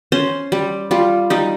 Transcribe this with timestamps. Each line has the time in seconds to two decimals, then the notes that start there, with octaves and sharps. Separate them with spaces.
0.12 C#4 C5
0.52 G3
0.91 G3 F4
1.30 G3 D#4